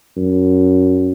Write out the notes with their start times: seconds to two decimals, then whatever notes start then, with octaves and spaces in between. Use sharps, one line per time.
0.17 F#2